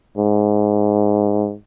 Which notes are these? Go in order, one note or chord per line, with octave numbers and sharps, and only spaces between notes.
G#2